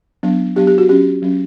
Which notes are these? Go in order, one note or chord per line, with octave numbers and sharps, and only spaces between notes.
F#3 B3 D4
F#3 B3 D4 G4
G4
F#4
F#3 C#4 G4
F#3 C#4